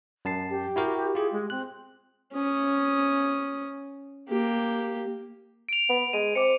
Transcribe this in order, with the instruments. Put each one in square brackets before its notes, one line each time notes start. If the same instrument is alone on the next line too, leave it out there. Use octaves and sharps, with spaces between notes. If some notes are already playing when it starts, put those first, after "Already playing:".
[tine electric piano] F#2 A5 C7
[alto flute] G4
[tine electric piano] E4 F#4 A#4
[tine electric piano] F4 G4 [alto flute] G#4
[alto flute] G#3
[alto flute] C4 [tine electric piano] F#6
[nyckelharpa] C#4 D#6
A#3 G4
[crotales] D7 F7
[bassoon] B3
[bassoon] G#3 [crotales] D#7
[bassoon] C4 [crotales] D6 C#7